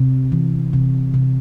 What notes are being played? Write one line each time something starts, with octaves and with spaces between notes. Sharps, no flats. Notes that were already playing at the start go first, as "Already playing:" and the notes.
Already playing: C3
E3
C3
C3